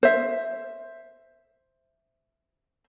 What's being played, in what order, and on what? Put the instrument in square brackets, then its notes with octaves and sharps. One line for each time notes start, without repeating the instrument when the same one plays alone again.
[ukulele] C5 E5